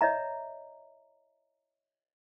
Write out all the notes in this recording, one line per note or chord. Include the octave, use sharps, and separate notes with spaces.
C#5 D#5 E5 A#5